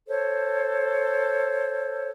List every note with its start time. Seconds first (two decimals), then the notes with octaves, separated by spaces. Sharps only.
0.08 A4 C5 C#5